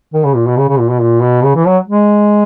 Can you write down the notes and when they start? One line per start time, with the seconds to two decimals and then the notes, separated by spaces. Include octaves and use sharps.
0.14 D#3
0.24 C#3
0.35 A#2
0.47 B2
0.57 C#3
0.69 C#3
0.79 A#2
0.90 B2
1.01 A#2
1.23 B2
1.44 C#3
1.55 E3
1.66 F#3
1.88 G#3